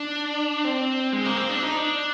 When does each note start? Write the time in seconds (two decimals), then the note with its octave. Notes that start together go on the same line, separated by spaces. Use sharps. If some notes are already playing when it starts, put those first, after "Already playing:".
Already playing: D4
0.64 C4
1.13 G#3
1.25 A#3
1.37 C4
1.49 D4
1.63 D#4
1.77 D4